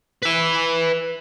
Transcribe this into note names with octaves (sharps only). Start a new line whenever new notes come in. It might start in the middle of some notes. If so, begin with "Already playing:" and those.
B4 E5